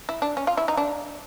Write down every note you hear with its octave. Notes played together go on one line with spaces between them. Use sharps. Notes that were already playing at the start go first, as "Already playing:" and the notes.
E4
D4
C#4
F4
E4
D#4
D4